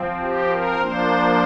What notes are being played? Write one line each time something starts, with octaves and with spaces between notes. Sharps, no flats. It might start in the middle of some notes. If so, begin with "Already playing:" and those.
Already playing: F3 C4
G4
A#4
F3 A#3 D4 C5